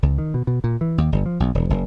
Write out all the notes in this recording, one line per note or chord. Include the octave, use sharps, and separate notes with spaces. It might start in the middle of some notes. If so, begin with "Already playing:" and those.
C#2
D#3
B2
B2
A#2
E3
D#2
G1
F3
B1
E1
F#1